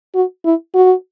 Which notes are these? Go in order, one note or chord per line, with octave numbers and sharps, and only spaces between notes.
F#4
E4
F#4